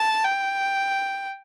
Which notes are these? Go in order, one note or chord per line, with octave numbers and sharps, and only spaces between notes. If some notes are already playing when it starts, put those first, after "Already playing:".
Already playing: A5
G5